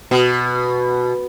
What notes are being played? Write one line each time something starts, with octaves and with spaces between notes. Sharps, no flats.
B2